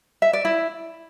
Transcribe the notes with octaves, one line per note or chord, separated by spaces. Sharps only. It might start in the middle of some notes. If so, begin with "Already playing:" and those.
E5
D5
E4